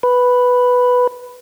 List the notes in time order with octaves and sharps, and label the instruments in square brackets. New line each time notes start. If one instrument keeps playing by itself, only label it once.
[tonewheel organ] B4